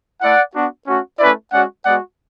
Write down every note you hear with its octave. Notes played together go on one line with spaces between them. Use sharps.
A3 E4 D5 F#5
B3 D4 F#4
A3 C#4 F#4
A3 C#4 E4 B4 D5
G#3 C#4 F#4 D5 F#5
G#3 B3 F#4 D5 F#5